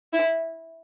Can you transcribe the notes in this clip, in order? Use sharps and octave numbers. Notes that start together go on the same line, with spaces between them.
E4